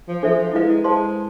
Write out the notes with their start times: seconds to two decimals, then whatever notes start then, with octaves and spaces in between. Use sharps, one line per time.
0.08 F3
0.23 F3 D4 A4 C5 E5
0.39 F3
0.53 G#3 E4 B4 F5
0.69 G#3
0.84 G#3 C5 F5 A5 C6